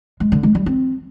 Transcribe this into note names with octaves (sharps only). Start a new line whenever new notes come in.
G#3
D3
G#3
G3
C4